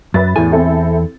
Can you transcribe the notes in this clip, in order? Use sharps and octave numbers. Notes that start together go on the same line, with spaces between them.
F#2 B4 E5 A6
E2 A2 G#5
C4 E4 A4